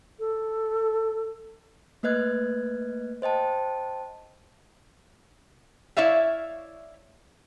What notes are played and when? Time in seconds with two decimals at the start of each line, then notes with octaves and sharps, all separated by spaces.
0.19 A4
2.03 A3 A#3 B4 D#5 F#6 G#6
3.22 C5 D#5 G5 A5
5.97 E4 C#5 D5 E5 F5